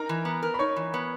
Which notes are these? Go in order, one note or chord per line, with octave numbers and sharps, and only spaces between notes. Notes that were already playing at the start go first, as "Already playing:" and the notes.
Already playing: D#4 A#4 A#5
E3
B3
A#4
B5
D#4 C#5 C#6
E3
B3